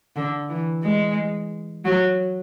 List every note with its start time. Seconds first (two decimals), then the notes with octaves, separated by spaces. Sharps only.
0.16 D3
0.49 E3
0.83 G#3
1.85 F#3